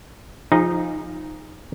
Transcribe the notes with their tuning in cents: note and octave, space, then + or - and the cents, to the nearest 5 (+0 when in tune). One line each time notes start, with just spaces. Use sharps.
F3 +0 D#4 +0 G#4 -25